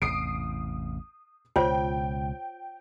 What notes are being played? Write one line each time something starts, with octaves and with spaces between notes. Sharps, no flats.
A1 E2 C3 D#6 C7 D7
C#2 B2 F4 C5 C#5 G5